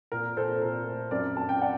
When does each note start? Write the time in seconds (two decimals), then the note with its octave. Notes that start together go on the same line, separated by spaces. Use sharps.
0.12 A#2 A#4
0.37 A#2 A4 C5
0.62 A#2 A#4
0.86 A3
1.11 F#2 A#4 D5
1.36 F#2 A5
1.49 G5
1.61 D5 F#5